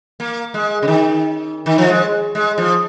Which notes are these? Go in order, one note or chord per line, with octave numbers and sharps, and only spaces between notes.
A#3
G#3
C#3
D#3
D#3
F3
G#3
G#3
F3